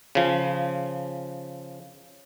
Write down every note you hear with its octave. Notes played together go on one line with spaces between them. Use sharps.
C#3 F3